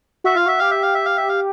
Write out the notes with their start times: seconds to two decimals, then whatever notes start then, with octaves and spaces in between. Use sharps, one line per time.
0.24 F#4 E5
0.36 F4 F5
0.46 F#4 E5
0.59 G4 F5
0.71 E5
0.83 F5
0.94 E5
1.06 F5
1.17 E5
1.29 F5